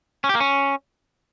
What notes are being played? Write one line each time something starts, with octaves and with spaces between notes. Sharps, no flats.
C#4
G4
A#3
C#4